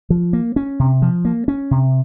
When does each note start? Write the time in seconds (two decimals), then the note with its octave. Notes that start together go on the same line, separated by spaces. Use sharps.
0.10 F3
0.33 A#3
0.56 C#4
0.79 C3
1.02 F3
1.25 A#3
1.48 C#4
1.71 C3